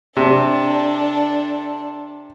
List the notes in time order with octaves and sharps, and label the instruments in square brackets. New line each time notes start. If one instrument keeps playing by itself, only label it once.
[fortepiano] C3 [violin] D4 A4